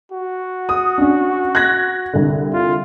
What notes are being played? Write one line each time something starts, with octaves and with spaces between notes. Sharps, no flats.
F#4
D#6
C#4 D4
F#6 G#6 A#6
C2 D3
F4